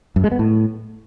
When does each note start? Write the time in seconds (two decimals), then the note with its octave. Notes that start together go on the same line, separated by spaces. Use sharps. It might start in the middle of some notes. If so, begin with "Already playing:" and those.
0.16 F#2
0.24 G#3
0.31 B3
0.39 A2